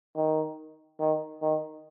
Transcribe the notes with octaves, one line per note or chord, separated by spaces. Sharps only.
D#3
D#3
D#3